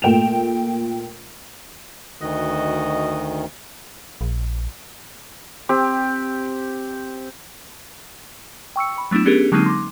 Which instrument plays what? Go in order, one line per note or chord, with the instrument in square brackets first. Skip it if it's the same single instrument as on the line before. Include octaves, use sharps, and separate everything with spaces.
[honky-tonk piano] A#2 A3 G5 E7 F7
[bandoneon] D2 D#3 [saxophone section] F#4 D#5
[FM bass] A#1
[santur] C4 G4
[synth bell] G5 C#6 E6 C#7
B5
F#3 A3 B3 D4 E4
B3 C#4 D4 G4 G#4 A#4
D3 F#3 G#3 A#3 C4 D#4
C6 D6